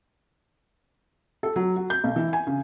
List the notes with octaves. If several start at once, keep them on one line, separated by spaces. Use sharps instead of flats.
A4
F#3
F#4
G6
B1
E3
G#5
C#3